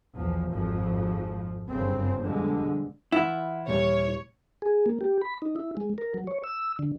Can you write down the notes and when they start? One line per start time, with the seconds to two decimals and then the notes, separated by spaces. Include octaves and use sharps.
0.16 B1 E2 F3
0.50 G#1 F2 F3
1.68 G1 F#2 C#3 C4
2.22 F2 B2 D3 G3 G#3
3.12 E3 E4 F4 F#5
3.68 D#2 A#2 G3 C#5
4.62 G#4
4.86 A#3
5.01 G4
5.21 B5
5.42 D#4
5.56 E4
5.77 G#3
5.98 A#4
6.14 F#3
6.27 C#5
6.44 E6
6.79 D3